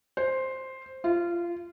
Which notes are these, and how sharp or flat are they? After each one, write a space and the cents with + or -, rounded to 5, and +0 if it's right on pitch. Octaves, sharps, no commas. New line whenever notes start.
C5 +5
F4 -20